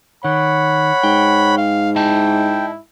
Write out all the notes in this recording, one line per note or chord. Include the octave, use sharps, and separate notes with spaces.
D#3 C#5 F#5 B5
G#2 G5
F5
E4 D#5 E5 G5 A5